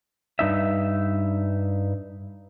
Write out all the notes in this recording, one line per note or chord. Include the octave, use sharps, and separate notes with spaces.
G2 D#4 E5